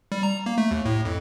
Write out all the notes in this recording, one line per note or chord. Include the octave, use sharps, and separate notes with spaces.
G3
A#5
A#3
A3
D#2
A2
F2